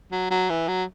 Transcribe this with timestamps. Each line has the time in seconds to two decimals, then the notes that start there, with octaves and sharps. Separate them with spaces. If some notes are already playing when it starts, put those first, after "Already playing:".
0.12 F#3
0.30 F#3
0.50 E3
0.68 F#3